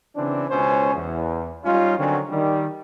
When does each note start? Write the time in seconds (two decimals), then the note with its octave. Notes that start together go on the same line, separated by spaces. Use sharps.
0.16 C#3 E3 C4 D4
0.50 C#2 B2 C#4 C5 C#5 G#5
0.95 E2
1.64 G3 C#4 D#4 F4
1.98 D3 D#3 F#3 C4 C#4
2.30 D#3 G3